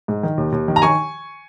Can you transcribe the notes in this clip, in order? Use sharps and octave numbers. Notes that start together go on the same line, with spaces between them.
G#2
D#3
D#2
D#2
D#3
A#5
D#3 G#5 C#6